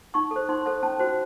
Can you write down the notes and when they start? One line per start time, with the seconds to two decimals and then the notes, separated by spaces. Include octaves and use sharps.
0.14 D#4 C#6
0.31 A4
0.36 C5
0.49 D#4 C6
0.66 A4 C5
0.83 C#4 A5
0.99 F#4 C5